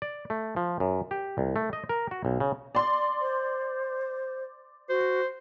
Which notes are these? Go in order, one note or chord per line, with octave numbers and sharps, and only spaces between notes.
D5
A3
F3
F#2
G4
C2
A3
D#5
A#4
F#4
B1
C#3
D5 C6
C5
F#4 C5